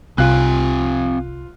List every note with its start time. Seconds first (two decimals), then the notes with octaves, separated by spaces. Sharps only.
0.18 C2 C3 C4 F4 F5 G#5 F#6